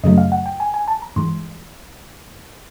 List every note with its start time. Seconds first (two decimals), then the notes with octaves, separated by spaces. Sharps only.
0.04 F#2 C#3 F#3 A3 D#5
0.18 F5
0.32 F#5
0.46 G5
0.60 G#5
0.74 G#5
0.88 A5
1.02 A#5
1.16 G2 E3 G#3 C6